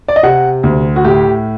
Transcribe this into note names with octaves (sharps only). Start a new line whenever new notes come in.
D5
D#5
C3 F#5
D2
F#4
A2 G4